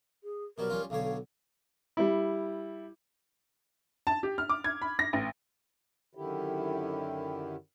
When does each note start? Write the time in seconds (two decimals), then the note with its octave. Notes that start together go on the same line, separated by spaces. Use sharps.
0.24 G#4
0.58 B2 F#3 G3 A#4
0.69 G3 C#4 F4
0.90 B1 D3 C#5 F5
1.97 G3 E4
4.07 A5
4.23 G4
4.38 F6
4.49 D6
4.64 G#6
4.81 B5
4.99 A#6
5.13 A1
6.15 F#2 D3 D#3 E4 G4